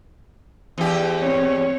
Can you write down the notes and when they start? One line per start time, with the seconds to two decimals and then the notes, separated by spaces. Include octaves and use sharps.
0.78 E2 G4
1.22 C4 C#5